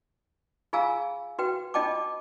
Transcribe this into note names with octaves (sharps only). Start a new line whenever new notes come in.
F4 G#4 F5 G#5 A#5 E6
F#4 B4 G5
D4 F4 D#5 G5 A5 D6